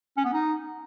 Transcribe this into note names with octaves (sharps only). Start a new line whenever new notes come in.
C#4
B3
D#4